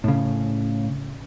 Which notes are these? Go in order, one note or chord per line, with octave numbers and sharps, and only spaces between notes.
A2 C#3